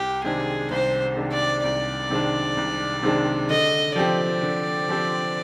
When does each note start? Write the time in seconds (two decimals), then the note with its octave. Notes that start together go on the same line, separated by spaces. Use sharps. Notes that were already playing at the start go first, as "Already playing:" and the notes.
Already playing: C2 G4
0.24 C3 D#3 G#3 D4 G#4
0.71 C2 C5
1.17 C3 D#3 G#3 D4
1.32 D5
1.64 C2 D5
2.10 C3 D#3 G#3 D4
2.57 C2
3.03 C3 D#3 G#3 D4
3.50 D3 D#5
3.96 F3 C4 G4 D5
4.42 D3
4.89 F3 C4 G4